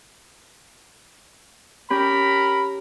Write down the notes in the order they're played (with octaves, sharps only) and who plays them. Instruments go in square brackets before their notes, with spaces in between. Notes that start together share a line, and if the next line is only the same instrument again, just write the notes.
[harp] C#4 G4 [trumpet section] A#4 B5